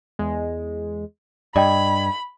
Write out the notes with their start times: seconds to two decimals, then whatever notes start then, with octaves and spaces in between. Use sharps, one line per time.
0.19 E2 G#3
1.56 G2 D5 D#5 G5 B5 G#6